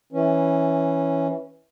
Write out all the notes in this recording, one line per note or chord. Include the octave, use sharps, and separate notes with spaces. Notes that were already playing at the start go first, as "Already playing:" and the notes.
E3 C#4